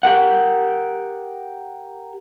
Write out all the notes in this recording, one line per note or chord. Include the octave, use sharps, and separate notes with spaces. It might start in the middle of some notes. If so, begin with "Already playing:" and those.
G4 A#4 F#5